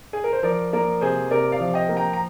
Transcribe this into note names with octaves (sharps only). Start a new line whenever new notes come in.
G#4
A#4
C5
F3 A#4 D5
A#3 A#4 D5
C3 G#4 C5
C3 A#4 D5
D5 F5
F3
D#5 G5
A#3
G5 A#5
A#5